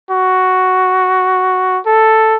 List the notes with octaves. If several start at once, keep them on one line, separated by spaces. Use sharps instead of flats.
F#4
A4